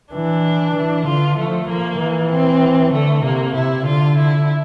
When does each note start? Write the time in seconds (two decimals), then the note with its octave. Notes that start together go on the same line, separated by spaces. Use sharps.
0.13 E3 D4
0.76 E3
1.06 D3 F4
1.38 F3 A3
1.68 F3 A#3
1.99 E3
2.31 C4
2.92 D3 A3
3.23 C3 A#3
3.54 C3 E4
3.85 D3 F4
4.16 E4